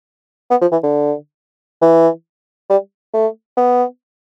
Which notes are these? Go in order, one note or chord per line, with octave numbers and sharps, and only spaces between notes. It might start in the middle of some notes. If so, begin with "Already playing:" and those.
B3
F3
E3
D3
E3
G3
A3
B3